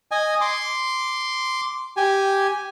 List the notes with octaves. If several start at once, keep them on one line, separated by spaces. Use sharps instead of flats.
D#5 G#5
C6 D6
G4 G#5